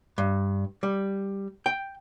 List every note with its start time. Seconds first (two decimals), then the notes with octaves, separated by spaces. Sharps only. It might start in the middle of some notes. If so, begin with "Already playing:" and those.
0.18 G2
0.83 G3
1.66 G5